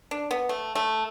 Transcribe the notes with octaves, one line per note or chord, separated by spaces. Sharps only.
D4
B3
A3
A3